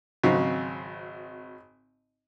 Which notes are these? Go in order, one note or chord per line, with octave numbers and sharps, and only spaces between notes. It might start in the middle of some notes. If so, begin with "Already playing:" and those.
G#1 C#3 F#3 C4